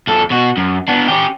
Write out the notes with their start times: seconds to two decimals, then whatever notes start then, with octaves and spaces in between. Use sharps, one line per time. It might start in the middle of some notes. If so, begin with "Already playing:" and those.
0.07 E2 A4
0.30 B2 F#4
0.57 F#2
0.88 B3 D4
1.08 C#4 G4